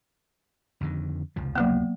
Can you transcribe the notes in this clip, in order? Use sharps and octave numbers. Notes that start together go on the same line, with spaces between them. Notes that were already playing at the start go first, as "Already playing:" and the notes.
F2 D3 D#3
F1 C#2 F3
F#3 A#3 B3